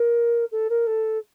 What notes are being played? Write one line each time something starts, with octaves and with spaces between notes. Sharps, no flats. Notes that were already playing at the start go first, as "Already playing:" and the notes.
Already playing: A#4
A4
A#4
A4